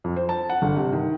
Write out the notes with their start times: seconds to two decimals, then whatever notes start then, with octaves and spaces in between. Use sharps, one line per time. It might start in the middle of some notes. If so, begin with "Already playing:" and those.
0.04 F2
0.16 C5
0.29 A5
0.50 F#5
0.62 G1
0.76 C3
0.93 D#3